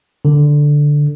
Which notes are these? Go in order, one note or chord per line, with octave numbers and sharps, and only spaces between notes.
D3